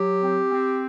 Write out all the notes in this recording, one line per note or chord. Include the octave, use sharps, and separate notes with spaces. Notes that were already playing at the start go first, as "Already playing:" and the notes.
Already playing: F#3 G4
C4
C4